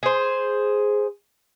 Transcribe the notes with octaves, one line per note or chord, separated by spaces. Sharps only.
G#4 C5